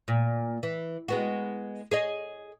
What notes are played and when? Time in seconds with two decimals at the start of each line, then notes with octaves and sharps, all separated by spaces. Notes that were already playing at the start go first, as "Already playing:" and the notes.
0.08 A#2
0.63 E3
1.08 G#3 B3 F#4
1.91 G#4 C#5 D#5